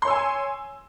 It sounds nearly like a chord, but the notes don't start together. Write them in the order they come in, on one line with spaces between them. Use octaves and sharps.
C6 C#5 E6 G#5